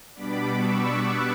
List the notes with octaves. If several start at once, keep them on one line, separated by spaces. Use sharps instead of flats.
B2 G3 B3 D4 B5 D6
C#6 E6
D6 F#6